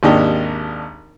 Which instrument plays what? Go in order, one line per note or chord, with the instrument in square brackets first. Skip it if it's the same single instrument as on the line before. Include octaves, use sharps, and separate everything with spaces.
[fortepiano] G#1 D#2 D4 D#4 G4